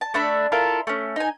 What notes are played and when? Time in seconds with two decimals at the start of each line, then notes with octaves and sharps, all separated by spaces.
0.01 A5
0.14 A3 D4 E5 B5
0.52 E4 F4 A4 A#4
0.87 A3 C#4
1.16 D#4 G#5